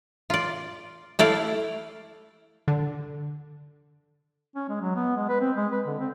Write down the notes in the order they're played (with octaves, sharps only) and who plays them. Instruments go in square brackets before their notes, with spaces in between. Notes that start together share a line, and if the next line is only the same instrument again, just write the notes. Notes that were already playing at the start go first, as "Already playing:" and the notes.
[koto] F4 D5
A3 E4 D5 F5
[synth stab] D3
[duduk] C#4
G#3
F#3
B3
G#3
B4
C4
G#3
B4
D3
C4